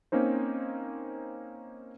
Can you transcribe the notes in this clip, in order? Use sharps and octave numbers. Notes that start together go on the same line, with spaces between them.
A#3 C4 C#4 D#4 C5